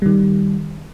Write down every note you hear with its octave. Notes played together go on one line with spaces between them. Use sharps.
D#3 G3